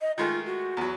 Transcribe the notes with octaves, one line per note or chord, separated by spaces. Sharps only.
D#5
D#3 G#3 A3 F4
F#4
E2 F#3